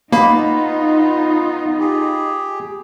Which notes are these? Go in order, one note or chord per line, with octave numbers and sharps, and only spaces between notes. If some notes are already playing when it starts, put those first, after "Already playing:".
A#3 B3 D#4 F4 B5
G4 G#4